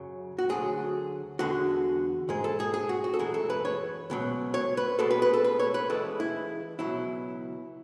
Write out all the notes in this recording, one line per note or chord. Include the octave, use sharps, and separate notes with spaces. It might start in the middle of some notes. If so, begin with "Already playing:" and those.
Already playing: F#2 C#3 F#3
F#4
D2 D3 F#3 G#4
E2 D3 G#3 F#4
G#2 G#3 G#4
A4
G#4
G#4
F#4
F#4
A4
F#2 E3 G#3 G#4
A4
B4
C#5
C#2 B2 F#3
C#5
B4
B1 B2 G#3 A4
B4
B4
A4
B4
C#5
B4
C#2 C#3 E3 G#3 A4
E4
C#2 B2 F#3 E4